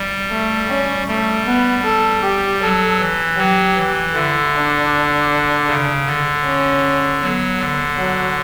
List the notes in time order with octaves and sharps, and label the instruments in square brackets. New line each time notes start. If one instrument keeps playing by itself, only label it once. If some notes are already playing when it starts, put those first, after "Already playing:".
Already playing: [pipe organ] G3
[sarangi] A3
C#4
[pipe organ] G3 [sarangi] A3
[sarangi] B3
A4
G4
[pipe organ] F#3 [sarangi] A4
[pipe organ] E3
[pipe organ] F#3 [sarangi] G4
[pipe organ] E3
[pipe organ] D3 [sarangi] E4
[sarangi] D4
[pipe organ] C#3
D3
[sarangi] C#4
[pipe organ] F#3 [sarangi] B3
[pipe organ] D3
[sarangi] F#3